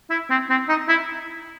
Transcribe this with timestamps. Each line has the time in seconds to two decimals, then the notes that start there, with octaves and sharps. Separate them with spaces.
0.10 E4
0.30 C4
0.50 C4
0.69 D#4
0.89 E4